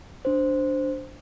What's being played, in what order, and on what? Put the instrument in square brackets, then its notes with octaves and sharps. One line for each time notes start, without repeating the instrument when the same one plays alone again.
[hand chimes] D4 C5